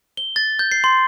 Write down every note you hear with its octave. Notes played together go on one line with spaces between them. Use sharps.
G7
A6
G6
C7
C6